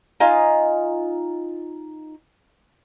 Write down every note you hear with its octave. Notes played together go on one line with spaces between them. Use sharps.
D#4 F4 G#5